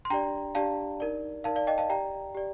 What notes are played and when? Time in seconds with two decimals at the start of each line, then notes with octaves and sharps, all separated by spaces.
0.05 C6
0.10 D4 G4 D5 G5 A#5
0.55 D4 G4 D5 F5 A5
1.00 D#4 A#4 D5
1.44 D#4 A#4 D5 F5 A5
1.56 D5 F5
1.67 D#5 G5
1.78 F5 A5
1.89 G4 D5 G5 A#5
2.34 G4 D5